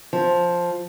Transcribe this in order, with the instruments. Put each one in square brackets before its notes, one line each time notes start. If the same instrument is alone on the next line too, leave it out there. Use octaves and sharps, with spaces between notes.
[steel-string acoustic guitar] F3